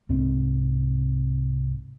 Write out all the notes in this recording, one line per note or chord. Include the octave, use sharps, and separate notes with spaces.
C2 G#2 C4